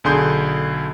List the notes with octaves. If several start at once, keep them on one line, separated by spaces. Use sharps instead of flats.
B1 D3 G#4 C6 G6